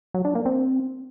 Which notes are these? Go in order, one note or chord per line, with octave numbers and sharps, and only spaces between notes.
F#3
D4
A#3
C4